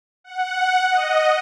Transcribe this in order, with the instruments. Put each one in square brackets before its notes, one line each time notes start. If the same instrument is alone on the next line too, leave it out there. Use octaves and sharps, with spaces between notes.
[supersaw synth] F#5
D#5